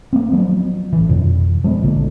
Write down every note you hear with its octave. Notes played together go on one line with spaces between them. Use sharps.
A#3 C4
F3 F#3 B3
A1 E3
F2 B2
F3 G#3 A#3 B3
A#1 D3 A#3